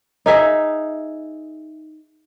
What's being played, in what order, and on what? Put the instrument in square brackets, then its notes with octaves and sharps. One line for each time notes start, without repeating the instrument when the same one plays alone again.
[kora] D#4 G#4 E5